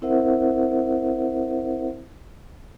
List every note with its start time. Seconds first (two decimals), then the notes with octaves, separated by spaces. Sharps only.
0.02 C4 E4 A#4 C5 E5 F#5